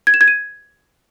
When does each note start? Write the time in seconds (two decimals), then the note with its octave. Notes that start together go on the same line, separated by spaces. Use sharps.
0.07 G#6
0.14 E7
0.21 G#6
0.28 D#7